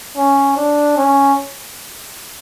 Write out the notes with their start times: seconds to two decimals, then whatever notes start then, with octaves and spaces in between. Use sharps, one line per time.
0.17 C#4
0.57 D4
0.97 C#4